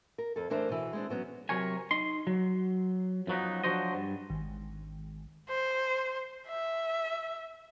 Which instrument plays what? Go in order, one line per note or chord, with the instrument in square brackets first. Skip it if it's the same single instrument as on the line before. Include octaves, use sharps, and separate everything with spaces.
[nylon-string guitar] A#4
F2 A4
E3 A3 D4 A#4 C5
B2 E3
G#3 C4 D4
F#3 B3 C#4
[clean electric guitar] C3 F#3 A#4 C#5 G#5
D#4 C6
F#3
F#2 F3 F#3 B3 D#4
F3 F#3 D4 F#4 C5 D#5
G2
[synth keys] G#1
[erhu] C5
E5